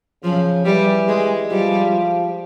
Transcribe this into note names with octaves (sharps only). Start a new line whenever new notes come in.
C#3 F3
E3 G3
G#3
F3 G3